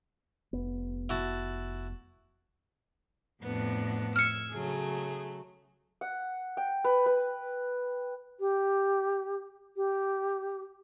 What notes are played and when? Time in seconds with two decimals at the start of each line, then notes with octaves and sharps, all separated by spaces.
0.53 F1 B3
1.09 E4 F#4 A5
3.43 F2 A2 B3 D4
4.16 E6 F6 G#6 C#7
4.52 C#3 F#3 A3 G#4
6.01 F#5
6.57 G5
6.84 B4
7.06 B4
8.40 G4
9.76 G4